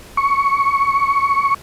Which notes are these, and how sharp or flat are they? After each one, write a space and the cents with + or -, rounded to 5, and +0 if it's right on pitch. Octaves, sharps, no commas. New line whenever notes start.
C#6 +5